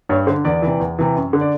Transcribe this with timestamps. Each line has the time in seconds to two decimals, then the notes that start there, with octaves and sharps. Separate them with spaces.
0.09 G2 C#5
0.27 D3 C5
0.45 E2 D5
0.62 C3 E3
0.80 E2
0.99 C3 E3
1.16 F#2
1.33 D3
1.41 D5